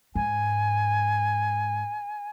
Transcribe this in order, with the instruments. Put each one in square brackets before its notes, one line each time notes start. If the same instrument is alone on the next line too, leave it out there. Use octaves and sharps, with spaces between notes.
[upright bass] G#2 [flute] G#5